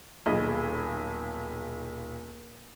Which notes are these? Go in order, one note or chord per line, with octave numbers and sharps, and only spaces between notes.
D#1 B1 G#4 D#5 B5